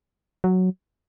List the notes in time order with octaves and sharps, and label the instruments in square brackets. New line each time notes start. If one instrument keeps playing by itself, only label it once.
[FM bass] F#3